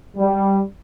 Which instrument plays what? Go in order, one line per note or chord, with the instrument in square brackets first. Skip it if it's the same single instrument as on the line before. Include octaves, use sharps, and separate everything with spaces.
[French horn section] G3